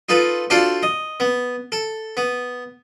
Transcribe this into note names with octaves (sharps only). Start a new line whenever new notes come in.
D#4 F4 A4 B4
D4 F4 F#4 A4 C5 F5
D#5
B3
A4
B3